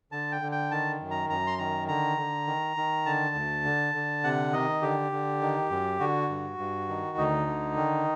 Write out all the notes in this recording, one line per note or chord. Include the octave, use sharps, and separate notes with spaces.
D3 A5
G5
D3
G5
D#3 A5
F#2
A#5
F#2 A#5
C6
D#3 A#5
D3 A#5
D3
D#3
D#3
D3 A5
D2
D3
D3
C3 F#5
D#3 D#5
D3 G4
D3
D#3
F#2
D3 F#4
G2
G2
D#3
D2 D#4
D3
D#3